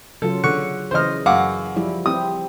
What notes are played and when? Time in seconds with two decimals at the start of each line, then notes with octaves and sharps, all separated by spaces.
0.22 C#3 F#3 F4 A4
0.44 D3 C#6 F#6 C#7
0.91 C#3 E3 C5 D#5 F6
1.26 F#2 F5 F#5 D6
1.76 F3 G3 E4
2.06 C4 E4 G4 D#6